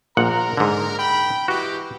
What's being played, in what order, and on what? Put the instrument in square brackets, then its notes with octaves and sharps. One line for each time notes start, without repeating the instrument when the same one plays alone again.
[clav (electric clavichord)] A#1 A#2 F#5 [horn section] A#4 A#5
[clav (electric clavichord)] G#2 D3
[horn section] G5 B5
[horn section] E3 G#3 G4 [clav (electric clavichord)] F#4